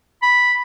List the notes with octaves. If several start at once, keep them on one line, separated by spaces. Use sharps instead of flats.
B5